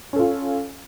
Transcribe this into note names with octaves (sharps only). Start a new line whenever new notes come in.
C#4 F4 A4